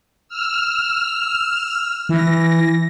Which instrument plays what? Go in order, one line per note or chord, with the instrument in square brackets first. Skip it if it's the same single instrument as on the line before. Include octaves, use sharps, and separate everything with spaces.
[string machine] E6 F6
[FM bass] E3 [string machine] A#6